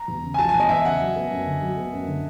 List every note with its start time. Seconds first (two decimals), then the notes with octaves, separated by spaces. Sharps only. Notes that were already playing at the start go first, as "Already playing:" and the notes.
Already playing: A#5
0.08 E2
0.24 C#3
0.34 G#5
0.38 F3 A5
0.49 G#5
0.54 E2
0.60 D#5
0.69 E2 E5
0.85 C#3 F#5
1.00 F#3
1.16 B3
1.31 F#2
1.47 D3
1.61 F#3
1.77 B3
1.93 F#2
2.08 D3